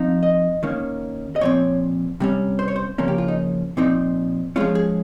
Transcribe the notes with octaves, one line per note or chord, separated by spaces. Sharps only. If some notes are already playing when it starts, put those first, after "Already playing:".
Already playing: F3 C4 D#4
D#5
D#3 A#3 C#4
D#5
A#2 F3 C4 C#5
C3 G3 C#4
C5
C#5
C5
C#3 F3 A#3 C#4
G4
F4
D#4
A#2 F3 C4 D#4
F3 G#3 C#4 F4
G#4